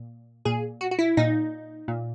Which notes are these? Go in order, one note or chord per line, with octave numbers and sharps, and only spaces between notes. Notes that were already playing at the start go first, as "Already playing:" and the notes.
Already playing: A#2
A#2 G#4
F#4
F#4
E4
A#2 D#4
A#2